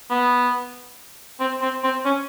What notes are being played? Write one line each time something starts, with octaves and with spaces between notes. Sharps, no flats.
B3
C4
C4
C4
C#4